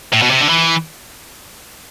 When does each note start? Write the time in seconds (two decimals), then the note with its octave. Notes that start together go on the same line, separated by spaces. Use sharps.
0.13 A2
0.22 B2
0.31 C3
0.41 D3
0.49 E3